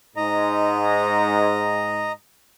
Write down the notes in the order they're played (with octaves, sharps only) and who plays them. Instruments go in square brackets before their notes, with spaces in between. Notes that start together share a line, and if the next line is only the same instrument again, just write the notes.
[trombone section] G#2 [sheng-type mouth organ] D#5 A#5